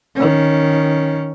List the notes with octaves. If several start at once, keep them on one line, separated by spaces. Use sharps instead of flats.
D#3 C#4